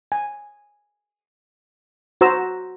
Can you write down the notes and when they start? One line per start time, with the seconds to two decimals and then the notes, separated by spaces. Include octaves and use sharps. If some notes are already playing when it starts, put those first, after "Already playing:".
0.12 G#5
2.21 F#4 C5 A#5 E6